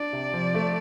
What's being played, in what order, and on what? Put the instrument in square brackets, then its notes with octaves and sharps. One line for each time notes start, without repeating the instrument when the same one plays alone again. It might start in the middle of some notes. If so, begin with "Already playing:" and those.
Already playing: [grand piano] D4 [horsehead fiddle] D5
[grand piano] C3
F3
A3